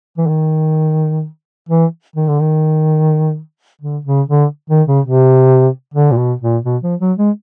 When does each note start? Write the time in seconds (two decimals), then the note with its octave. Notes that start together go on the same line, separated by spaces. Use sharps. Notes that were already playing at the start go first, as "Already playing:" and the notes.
0.17 E3
0.27 D#3
1.69 E3
2.16 D#3
2.28 D3
2.40 D#3
3.81 D3
4.05 C#3
4.28 D3
4.70 D#3
4.87 C#3
5.05 C3
5.94 D3
6.11 A#2
6.17 B2
6.41 A#2
6.65 B2
6.83 F3
7.00 F#3
7.18 G#3